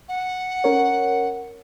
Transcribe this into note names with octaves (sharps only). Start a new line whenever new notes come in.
F#5
C#4 A#4 C#5